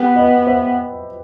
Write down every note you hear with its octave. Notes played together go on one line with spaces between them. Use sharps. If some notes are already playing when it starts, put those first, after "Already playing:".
Already playing: B3 G4 B4
B4 D#5
C5 E5